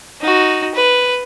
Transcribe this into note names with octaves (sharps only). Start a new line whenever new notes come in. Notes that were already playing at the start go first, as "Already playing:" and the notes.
D#4 F#4
B4